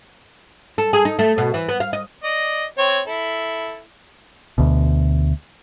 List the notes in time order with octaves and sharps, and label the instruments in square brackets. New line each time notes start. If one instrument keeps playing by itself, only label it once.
[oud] A4
G#4
D#4
A3
B2
E3
B3
F5
D#5
[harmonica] D5 D#5
C4 C#5
E4 A4
[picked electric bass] D2 B2